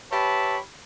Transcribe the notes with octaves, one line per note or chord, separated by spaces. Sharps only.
G4 B4 C#5 E5 A5 B5